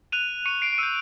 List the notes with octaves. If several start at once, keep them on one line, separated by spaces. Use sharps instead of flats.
F#6 D#7 F7
C#6 C#7 D#7
C7 D7
D7
E6 G6 C#7 D#7